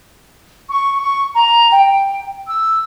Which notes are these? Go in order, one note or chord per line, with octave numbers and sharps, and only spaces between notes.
C#6
C#6
A#5
G5
E6